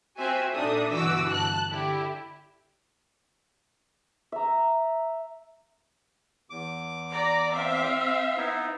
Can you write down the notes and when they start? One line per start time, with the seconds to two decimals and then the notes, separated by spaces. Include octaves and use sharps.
0.18 C4 F4 F#4 E5 G#5
0.53 A#2 D4 D#4 A4 E5 D#6
0.92 G1 B2 E3 F#4 D6 E6
1.30 A5 F#6
1.70 D3 E4 G4
4.32 E5 A#5
6.50 E2 D6
7.12 D5 A#5
7.53 C4 E5 F5
8.37 B3 D#4 E4